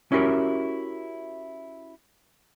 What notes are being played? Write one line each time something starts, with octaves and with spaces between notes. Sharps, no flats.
C#4 E4 F#4 G4 A#4